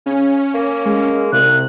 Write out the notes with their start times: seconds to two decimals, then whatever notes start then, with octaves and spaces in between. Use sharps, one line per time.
0.06 C#3 C#4
0.54 A#3
0.85 G#3
1.33 C2 C3 F#6